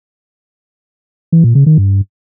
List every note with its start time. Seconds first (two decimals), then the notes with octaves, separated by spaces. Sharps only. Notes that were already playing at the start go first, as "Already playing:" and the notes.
1.32 E3
1.44 A#2
1.55 C#3
1.66 D#3
1.78 G2